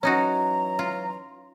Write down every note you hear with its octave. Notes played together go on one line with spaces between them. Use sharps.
E3 F#3 C#4 D#4 F#4 C#5 A#5
F4